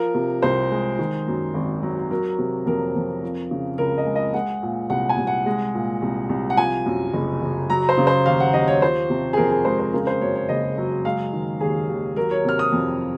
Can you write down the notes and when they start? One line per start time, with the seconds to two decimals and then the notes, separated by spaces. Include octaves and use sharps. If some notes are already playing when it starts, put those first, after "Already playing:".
Already playing: F3 A#4
0.15 C3
0.42 C2 C5
0.72 G#3
0.99 D#3
1.28 F#2
1.54 G#1
1.83 F#3
2.11 F#3 A#4
2.39 C3
2.66 F2 A#4
2.95 F2
3.22 F3
3.51 C#3
3.78 C#2 A#4
3.98 D#5
4.06 G#3
4.16 D#5
4.34 G#3 F#5
4.63 A#2
4.90 C2 F#5
5.09 G#5
5.18 C2
5.27 F#5
5.46 G#3
5.74 A#2
6.02 C2
6.29 C2
6.50 F#5
6.57 F3 G#5
6.86 F#2
7.13 F#1
7.42 F#1
7.70 F#3 A#5
7.89 C5
7.98 C#3
8.07 C5
8.26 D#2 F5
8.40 F#5
8.54 D#2 D#5
8.68 C#5
8.82 F3 C5
9.10 C3
9.33 G#4
9.37 F2 A#4
9.51 G#4
9.65 G#3 C5
9.79 C5
9.93 C#3 A#4
10.07 C5
10.21 F#2 C#5
10.35 C#5
10.49 F#1 D#5
10.78 F#3
11.05 G#3 F5
11.33 D#3
11.61 D#2 G#4
11.89 D#2
12.16 F#3 A#4
12.31 C#5
12.45 C3 F6
12.59 D#6
12.72 F2